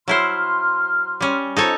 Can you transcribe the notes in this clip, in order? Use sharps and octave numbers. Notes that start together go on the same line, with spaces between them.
F#3 E4 C5 C6 F6
G3 C#4
D#4 F4 A4 C5 C#5 D#5